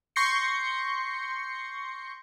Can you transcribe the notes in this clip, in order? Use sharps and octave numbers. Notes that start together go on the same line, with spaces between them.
C6 C#6 G6 A#6 C7 C#7